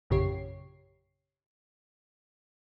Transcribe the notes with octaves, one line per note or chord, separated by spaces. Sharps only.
A#1 F#2 C#3 G4 C#5 C7